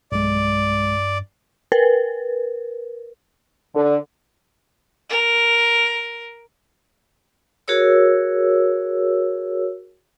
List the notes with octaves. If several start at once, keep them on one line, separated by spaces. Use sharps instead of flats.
B1 G2 G#3 D5
A#4 B4
D3
A#4
F#4 G#4 A#4 C#5 E6